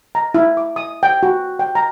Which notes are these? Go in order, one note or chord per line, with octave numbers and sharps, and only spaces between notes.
A#5
E4
D6
D#6
G5
F#4
G5
A#5